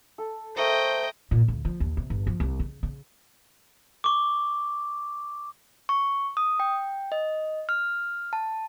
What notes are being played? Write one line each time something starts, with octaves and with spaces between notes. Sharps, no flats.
A4
A3 A#4 C5 D#5 G5
A#2
D2
F3
D#2
C3
G1
F3
C2
C#3
C#3
C#6 D6
C#6
D#6
G5
D#5
F6
A5